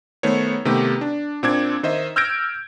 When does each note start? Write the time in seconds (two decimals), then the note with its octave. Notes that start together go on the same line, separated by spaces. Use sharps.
0.23 D#3 A3 B3 C5 C#5
0.65 C3 D#3 A3 B3 G4
1.01 D4
1.43 A#2 C4 D4 D6 G#6
1.83 D#3 C5 D#5 E5
2.16 E6 F6 G6 G#6 A#6 D7